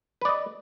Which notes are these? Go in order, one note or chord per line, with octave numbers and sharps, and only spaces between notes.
B4 D5 D#5